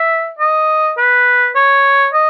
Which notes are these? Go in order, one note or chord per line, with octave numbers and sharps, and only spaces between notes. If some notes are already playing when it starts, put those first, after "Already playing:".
Already playing: E5
D#5
B4
C#5
D#5